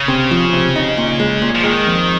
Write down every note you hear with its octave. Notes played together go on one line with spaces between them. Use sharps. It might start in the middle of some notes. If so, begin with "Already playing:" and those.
Already playing: C#3
C3
F3
C3
D#4
A#2
G#3
A#2
F3
D#3 G#3
F2